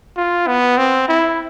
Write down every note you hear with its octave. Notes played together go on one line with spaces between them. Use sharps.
F4
B3
C4
E4